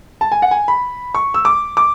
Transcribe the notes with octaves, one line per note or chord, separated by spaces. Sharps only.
A5
G#5
F#5
G#5
B5
C#6
E6
D6
D6